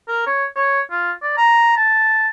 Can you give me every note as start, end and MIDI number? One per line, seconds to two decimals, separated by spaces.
0.08 0.26 70
0.27 0.45 73
0.56 0.81 73
0.91 1.12 65
1.22 1.36 74
1.37 1.74 82
1.77 2.28 81